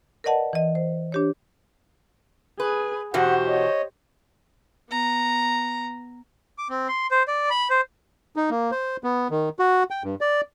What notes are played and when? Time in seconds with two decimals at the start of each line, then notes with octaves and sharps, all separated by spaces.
0.24 A#4 B4 D5 D#5 F#5 A5
0.53 E3 D#5
0.75 C5
1.12 D4 G4 C#5
2.60 G#4 B4
3.14 E2 B2 F#4 G4 C5 F#5
3.48 C#5 D#5
4.89 B3 A#5
6.58 D6
6.70 C4
6.88 C6
7.11 C5
7.28 D5
7.50 B5
7.70 C5
8.36 D#4
8.50 A#3
8.71 C5
9.04 B3
9.31 D#3
9.59 F#4
9.91 G5
10.04 G2
10.21 D5